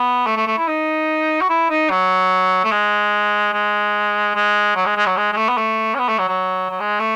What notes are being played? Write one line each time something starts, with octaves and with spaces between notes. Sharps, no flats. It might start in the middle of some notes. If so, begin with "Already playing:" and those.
Already playing: B3
A3
A3
A3
E4
D#4
F#4
E4
D#4
F#3
A3
G#3
G#3
G#3
F#3
G#3
G#3
F#3
G#3
G#3
A3
B3
A3
C#4
B3
A3
F#3
F#3
F#3
G#3
A3